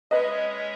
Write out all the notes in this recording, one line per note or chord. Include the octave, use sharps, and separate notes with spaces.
G#3 C#4 G#4 B4 C#5 D#5 E5